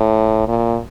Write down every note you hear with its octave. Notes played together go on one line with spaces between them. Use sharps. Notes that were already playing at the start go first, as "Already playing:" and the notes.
Already playing: A2
A#2